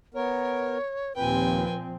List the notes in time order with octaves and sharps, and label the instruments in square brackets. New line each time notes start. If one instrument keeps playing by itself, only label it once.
[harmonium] B3 A#4 [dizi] C#5
[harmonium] D#2 [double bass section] A#2 F3 C4 [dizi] B4 [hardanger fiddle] G5 G#5